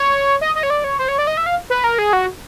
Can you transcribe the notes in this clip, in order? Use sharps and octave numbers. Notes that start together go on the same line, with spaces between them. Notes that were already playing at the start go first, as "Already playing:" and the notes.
Already playing: C#5
D#5
D#5
C#5
D5
C#5
C5
C#5
D5
D#5
E5
F5
B4
A#4
G#4
F#4